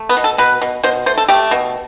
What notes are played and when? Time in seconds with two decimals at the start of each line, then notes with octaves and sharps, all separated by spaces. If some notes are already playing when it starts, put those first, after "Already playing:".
Already playing: A3
0.09 B3
0.17 B2
0.24 A4
0.38 B2 B4
0.62 B2
0.84 B2 C5
1.06 A3 C5
1.18 A4
1.28 A3 G4
1.51 B2